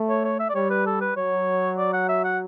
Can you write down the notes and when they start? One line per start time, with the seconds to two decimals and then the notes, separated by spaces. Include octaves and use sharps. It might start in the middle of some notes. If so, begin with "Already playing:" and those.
Already playing: A3
0.09 C#5
0.25 C#5
0.40 E5
0.49 D5
0.55 G3 C#5
0.71 B4
0.86 A4
1.01 B4
1.16 F#3 C#5
1.78 D5
1.93 F#5
2.09 E5
2.24 F#5